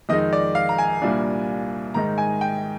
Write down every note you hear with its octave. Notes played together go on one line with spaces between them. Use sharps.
F2 D#3 G#3 D#4 D#5
D5
F5
A#5
G#5
C2 A#2 G3 A#3 D4
G#2 D#3 G#3 D#4 A#5
G#5
G5